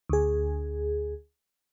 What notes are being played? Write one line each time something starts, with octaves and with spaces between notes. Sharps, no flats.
D2 G#4